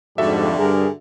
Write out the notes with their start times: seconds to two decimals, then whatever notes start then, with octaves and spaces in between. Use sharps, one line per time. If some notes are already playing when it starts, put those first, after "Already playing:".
0.18 F2 G#2 D3 G3 F#4 G4 A4 E5
0.57 G2 G#4 A#4